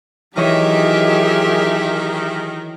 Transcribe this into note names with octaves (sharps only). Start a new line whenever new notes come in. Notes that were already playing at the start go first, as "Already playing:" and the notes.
D#3 E3 F#3 G4 G#4 C#5 D#5 E5